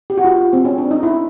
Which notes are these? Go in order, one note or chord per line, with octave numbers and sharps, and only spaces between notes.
G4
F#4
F4
C4
C#4
D4
D#4
E4